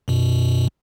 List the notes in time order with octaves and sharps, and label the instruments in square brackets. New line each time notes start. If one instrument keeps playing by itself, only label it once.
[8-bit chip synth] F#2 B2